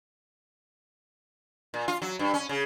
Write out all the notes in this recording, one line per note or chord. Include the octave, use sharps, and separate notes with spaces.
A#2
F4
F#3
G2
C#4
C#3